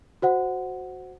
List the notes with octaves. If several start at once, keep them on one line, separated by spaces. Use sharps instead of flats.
F#4 C5 F#5